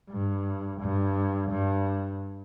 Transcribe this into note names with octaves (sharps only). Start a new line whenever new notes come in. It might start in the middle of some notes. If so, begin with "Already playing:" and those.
G2
G2
G2